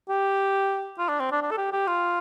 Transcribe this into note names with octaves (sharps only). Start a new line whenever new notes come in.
G4
F4
D4
C4
D4
D4
A4
G4
G4
F4